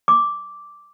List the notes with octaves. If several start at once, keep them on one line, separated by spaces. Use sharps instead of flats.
D6